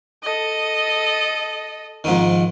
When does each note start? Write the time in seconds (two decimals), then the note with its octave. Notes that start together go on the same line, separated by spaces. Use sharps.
0.24 A4 D#5
2.04 F2 G#2 D#3